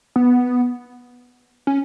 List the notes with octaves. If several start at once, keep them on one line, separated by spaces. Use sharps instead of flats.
B3
C#4